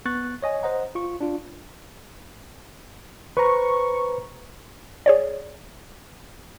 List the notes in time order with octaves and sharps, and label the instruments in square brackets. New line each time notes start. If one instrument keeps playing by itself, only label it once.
[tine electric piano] B3 C#6 F#6 A6
C#5 D#5 G#5
C5 D#5 F#5 A#5
F4 C#6
D4 F4
[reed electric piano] B4 C5 A#5 [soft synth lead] C#6
[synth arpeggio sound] G#4 C#5 D5